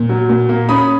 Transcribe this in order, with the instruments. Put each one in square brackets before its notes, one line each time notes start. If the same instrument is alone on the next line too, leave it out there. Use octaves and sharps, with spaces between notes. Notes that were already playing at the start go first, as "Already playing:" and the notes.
Already playing: [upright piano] A#2
F#3
A#2
A#3
C#4 B5 D#6